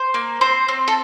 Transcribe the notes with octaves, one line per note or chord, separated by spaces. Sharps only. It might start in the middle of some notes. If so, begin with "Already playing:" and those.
Already playing: C5
A#3
C4 C5
C4
A4